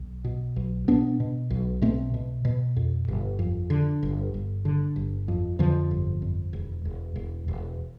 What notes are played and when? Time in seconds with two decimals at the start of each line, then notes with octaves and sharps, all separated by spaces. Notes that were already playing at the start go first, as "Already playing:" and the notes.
Already playing: B1
0.24 B2
0.56 B1
0.88 B2 B3 D4
1.20 B2
1.50 B1
1.82 B2 A3 C4
2.14 B2
2.45 B2
2.76 F2
3.08 G1
3.39 F2
3.70 D3
4.03 G1
4.34 G1
4.65 D3
4.96 G1
5.28 F2
5.59 F2 D3 F3
5.91 G1
6.22 F2
6.53 E1
6.85 E1
7.16 E1
7.48 E1